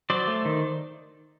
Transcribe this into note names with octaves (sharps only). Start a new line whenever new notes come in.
F#3 C5 D5
A3
D#3